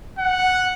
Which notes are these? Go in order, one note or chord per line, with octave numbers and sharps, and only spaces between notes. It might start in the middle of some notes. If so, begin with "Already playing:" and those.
F#5